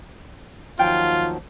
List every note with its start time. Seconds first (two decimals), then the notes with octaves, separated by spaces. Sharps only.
0.79 D#2 F3 F#3 F4 G5